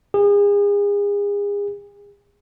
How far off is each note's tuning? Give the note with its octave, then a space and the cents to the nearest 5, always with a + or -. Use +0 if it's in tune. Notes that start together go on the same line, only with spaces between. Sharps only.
G#4 -35